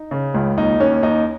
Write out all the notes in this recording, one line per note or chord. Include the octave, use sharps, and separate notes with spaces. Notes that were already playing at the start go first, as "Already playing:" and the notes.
Already playing: D#4
C#3
C#2
D#2 D#4
D#2 C#4
D#2 D#4